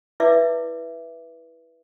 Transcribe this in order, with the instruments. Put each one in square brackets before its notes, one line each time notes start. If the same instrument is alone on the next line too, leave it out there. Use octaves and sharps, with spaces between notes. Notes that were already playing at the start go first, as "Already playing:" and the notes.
[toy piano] E4 B4 C#5 D5 E5 D6